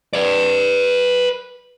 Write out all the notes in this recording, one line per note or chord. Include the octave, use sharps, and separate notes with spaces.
B4 D5